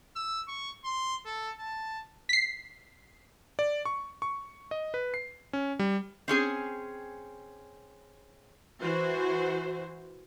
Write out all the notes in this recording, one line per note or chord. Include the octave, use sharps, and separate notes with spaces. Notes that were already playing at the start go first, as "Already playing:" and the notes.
E6
C#6
C6
A4
A5
B6 C7
D5
C#6
C#6
D#5
B4
C7
C#4
G3
C4 C#4 G#4
E3 F#4 C5